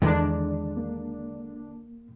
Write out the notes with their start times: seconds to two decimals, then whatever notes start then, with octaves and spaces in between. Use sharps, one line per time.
0.02 E2 D3 D#3 G#3 D4
0.77 A#3